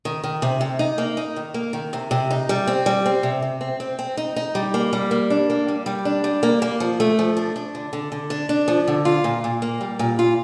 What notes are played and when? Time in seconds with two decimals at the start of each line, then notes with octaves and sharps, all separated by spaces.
0.05 D#3
0.24 D#3
0.42 C3
0.61 C3
0.79 D#4
0.98 A#3
1.17 D#4
1.36 D#3
1.54 A#3
1.73 D#3
1.93 C3
2.11 C3
2.31 D#4
2.49 G3
2.67 C4
2.86 G3
3.06 C4
3.23 C3
3.42 C3
3.61 C4
3.80 C4
3.99 C4
4.17 D#4
4.36 D#4
4.55 G3
4.74 A#3
4.93 G3
5.11 A#3
5.30 D4
5.50 A#3
5.68 G3
5.86 G3
6.05 D4
6.24 G3
6.43 A#3
6.62 A#3
6.80 F3
7.00 A3
7.19 F3
7.37 D4
7.56 D4
7.75 D3
7.93 D3
8.12 D3
8.30 D4
8.49 D4
8.68 F3
8.88 D3
9.05 F4
9.24 A#2
9.44 A#2
9.62 A#3
9.81 G3
9.99 A#2
10.19 F4